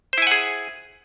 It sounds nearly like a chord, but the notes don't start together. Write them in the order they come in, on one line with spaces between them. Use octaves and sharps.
C5 E4 G#5 F#5 G#4